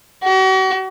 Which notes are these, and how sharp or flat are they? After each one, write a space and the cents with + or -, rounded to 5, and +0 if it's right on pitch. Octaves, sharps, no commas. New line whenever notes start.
F#4 +40